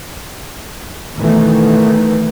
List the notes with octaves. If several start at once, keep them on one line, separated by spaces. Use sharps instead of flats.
B2 D#3 E3 A3 B3